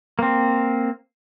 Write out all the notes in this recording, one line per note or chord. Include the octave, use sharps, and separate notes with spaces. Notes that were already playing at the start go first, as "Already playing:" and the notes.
A#3 C4